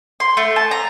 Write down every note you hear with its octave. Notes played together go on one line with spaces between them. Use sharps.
C6
A3
A5
A#5